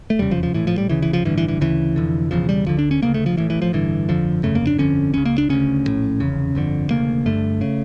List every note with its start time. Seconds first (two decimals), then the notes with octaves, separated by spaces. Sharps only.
0.10 A3
0.19 F1 E2 C#3 G3
0.31 F3
0.43 F3
0.54 A#1 A2 E3
0.67 F3
0.78 G3
0.89 D2 C#3 E3
1.02 E3
1.13 F3
1.25 A1 G2 D3 E3
1.38 E3
1.48 E3
1.61 D2 C#3 E3
1.96 F1 F2 D3
2.31 E1 E2 C#3 F3
2.49 G3
2.66 D2 D3 F3
2.79 D4
2.91 C#4
3.02 D2 C#3 A#3
3.14 A3
3.26 F3
3.37 A1 A2 E3
3.50 E3
3.62 F3
3.72 A1 G2 D3 E3
4.08 G1 F2 D3 F3
4.43 G1 F2 C#3 A3
4.55 A#3
4.67 D4
4.78 G1 F2 D3 C#4
5.14 C#2 C#3 C#4
5.25 A#3
5.38 D4
5.49 D2 C#3 C#4
5.85 A#1 A2
6.20 F1 E2 C#3
6.55 G1 F2 D3
6.91 E1 D2 C#3 A#3
7.26 G1 G2 D3 A3
7.61 C#3